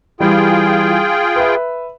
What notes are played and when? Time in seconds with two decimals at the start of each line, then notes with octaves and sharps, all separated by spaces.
0.20 E3 G3 F4 G#4 G5
1.36 B4 E5